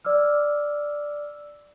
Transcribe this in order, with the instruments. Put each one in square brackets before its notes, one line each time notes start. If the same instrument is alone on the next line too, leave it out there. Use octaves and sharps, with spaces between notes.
[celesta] D5 D6 E6 F6